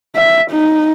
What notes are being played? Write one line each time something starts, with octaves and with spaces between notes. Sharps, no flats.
E5
D#4